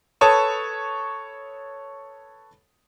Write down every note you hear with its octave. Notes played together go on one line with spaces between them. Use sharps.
A4 B4 C#5 A5 C#6 D#6